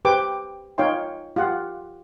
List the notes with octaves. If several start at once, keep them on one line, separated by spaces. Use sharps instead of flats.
G4 B4 C5 G5 D6
D#4 F4 C#5 F5 G5 C6
F4 G4 F#5